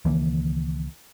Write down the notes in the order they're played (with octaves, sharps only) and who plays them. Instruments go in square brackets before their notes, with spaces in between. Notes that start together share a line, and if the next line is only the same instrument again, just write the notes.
[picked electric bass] C#2 D#3 E3 A#3